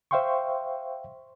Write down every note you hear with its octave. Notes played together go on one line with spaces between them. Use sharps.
C5 E5 F5 G5 C6 C#6